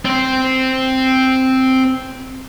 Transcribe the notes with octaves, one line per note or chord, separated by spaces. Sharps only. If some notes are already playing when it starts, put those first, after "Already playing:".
C4 C5